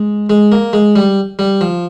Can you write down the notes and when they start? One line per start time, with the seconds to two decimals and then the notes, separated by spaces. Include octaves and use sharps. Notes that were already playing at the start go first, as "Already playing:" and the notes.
Already playing: G#3
0.30 G#3
0.52 A#3
0.73 G#3
0.96 G3
1.39 G3
1.61 F3